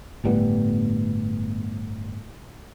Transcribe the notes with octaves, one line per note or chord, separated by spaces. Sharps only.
G1 A2 G3 B3